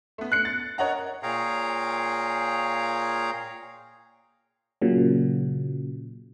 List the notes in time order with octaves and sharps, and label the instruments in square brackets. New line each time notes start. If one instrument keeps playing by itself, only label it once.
[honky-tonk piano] A3 B3
F#6 C7 C#7
A6
A#4 C#5 D#5 F#5 A#5
[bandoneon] A#2 G#4 C#5 F5 G5 A#5
[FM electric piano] A#2 C#3 F#3